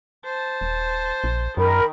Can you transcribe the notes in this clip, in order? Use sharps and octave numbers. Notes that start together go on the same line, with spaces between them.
C5 A5
D#1
A#1
F#2 D#3 A#4 B5